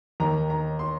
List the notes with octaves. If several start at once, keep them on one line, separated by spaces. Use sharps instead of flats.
D#2 D#3 A#5
A#5
C6